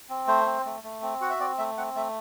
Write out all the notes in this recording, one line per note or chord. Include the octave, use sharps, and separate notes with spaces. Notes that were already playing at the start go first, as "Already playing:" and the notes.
C4
A3 C5
C4
A3
A3
C4
F#4 F#5
E5
C4 D5
A3 E5
C4 F#5
A3 E5